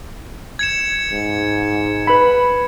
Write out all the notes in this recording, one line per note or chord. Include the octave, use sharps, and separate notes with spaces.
G#6 C#7 E7
G#2
B4 B5